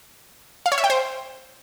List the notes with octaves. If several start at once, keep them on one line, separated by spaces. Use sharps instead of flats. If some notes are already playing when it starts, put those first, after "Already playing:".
F5
C#5
E5
G5
C5